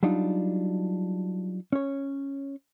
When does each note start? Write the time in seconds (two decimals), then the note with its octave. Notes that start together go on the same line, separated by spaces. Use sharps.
0.03 F#3 G3 D4 D#4 F4
1.73 C#4 C#5